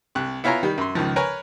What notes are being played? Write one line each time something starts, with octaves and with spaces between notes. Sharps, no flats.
C2 F#6
B3 E4 F4 C#5 G#5 A#5
D#3 G3
F#2 C6
C#2 D#3 F3
A#4 B4 C#5 G#5 A#5